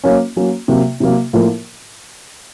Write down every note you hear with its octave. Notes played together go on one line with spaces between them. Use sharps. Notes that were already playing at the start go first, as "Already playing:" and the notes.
F#3 A#3 C#4
F#3 A#3 C#4
C3 F#3 A#3
C3 F#3 A#3
A2 F3 A#3 F4 A#4